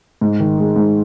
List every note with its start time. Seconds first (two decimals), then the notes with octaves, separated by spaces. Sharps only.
0.21 G#2
0.40 D#3
0.58 G#3
0.76 G#2